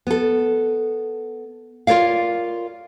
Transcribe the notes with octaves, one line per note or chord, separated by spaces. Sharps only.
B3 A4
F4 A#4 C#5 D5 F5